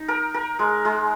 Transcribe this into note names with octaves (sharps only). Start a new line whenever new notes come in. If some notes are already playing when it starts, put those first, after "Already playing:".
Already playing: D#4
A#4
A#4
G#3
G#3